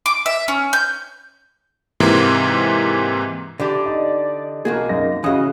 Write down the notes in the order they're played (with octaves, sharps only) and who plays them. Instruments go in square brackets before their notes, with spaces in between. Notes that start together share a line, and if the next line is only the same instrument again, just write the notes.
[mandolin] D6
E5
C#4
G6
[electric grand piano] G#2 C3 E3 A#3
[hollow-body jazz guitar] D3 E3 G4 [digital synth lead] D5
[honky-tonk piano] D#4
[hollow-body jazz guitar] B1 F#4 G#4 [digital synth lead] A#3
[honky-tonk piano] F#2 D#4 A#6
[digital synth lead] C#3 [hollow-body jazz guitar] E3 D#5 [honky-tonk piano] F#4 F5 D#6